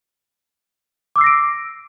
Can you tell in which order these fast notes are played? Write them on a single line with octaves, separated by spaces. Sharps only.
D6 E6 C7 A#6 D7